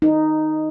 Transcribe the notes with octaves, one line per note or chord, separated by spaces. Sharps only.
D#4